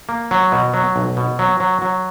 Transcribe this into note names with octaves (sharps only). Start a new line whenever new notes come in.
A#3
F#3
B2
F#3
B1
B2
F#3
F#3
F#3